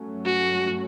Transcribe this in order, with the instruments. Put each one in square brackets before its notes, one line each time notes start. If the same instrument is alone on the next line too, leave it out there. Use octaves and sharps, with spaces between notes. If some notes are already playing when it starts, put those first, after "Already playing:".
Already playing: [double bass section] G2 F#3 A3 C#4
[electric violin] F#4